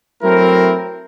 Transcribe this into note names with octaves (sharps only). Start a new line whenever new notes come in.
F#3 A3 C4 E4 A#4